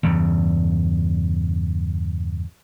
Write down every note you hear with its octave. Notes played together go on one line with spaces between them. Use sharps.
E2 G2 C#3